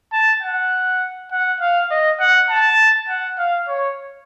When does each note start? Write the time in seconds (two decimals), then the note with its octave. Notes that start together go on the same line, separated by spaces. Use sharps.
0.12 A5
0.42 F#5
1.31 F#5
1.60 F5
1.91 D#5
2.20 F#5
2.50 A5
3.08 F#5
3.38 F5
3.68 C#5